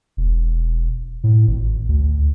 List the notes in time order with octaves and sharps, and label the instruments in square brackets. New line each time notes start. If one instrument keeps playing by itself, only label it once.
[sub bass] E1
A2
G#1
D2